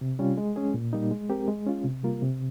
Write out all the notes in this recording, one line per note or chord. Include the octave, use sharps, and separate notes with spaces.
C3
G3 C#4 F4
G#3
C#4 G#4
A#2
G3 A#3 D#4
G#3
C4 G4 A#4
G#3
C#4 F4
C3
G3 A#3 F4 A#4
C3